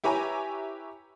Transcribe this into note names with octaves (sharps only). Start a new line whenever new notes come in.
E4 G4 B4 C#5 G#5 A#5